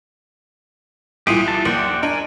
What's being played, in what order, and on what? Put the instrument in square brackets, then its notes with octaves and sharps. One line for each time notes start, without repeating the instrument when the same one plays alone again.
[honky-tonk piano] C2 A#2 E3 [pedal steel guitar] G4 G#4
[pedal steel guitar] A5
[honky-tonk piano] A#1 D#2 [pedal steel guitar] D5 F#5 G5
[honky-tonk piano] D4 [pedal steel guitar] A#4 G#5